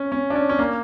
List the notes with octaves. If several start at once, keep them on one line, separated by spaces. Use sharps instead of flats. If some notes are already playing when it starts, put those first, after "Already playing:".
Already playing: C#4
C#4
D4
C#4
C#4
A#3